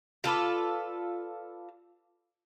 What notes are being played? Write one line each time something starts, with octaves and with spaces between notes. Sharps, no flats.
F4 A4 B4 D5